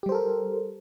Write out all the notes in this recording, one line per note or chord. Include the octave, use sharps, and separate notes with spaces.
G3 G4 A4 A#4 C5